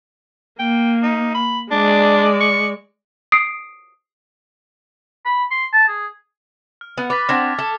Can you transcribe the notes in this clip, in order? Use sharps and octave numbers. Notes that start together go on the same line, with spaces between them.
A#3 G5
D#4
B5
G#3 D4 D5
C#6
D#6 C7 D7
B5
C6
A5
G#4
F6
B3 F#5
B4 D6 A6 B6
C4 D4 F#5 F6 G#6
A4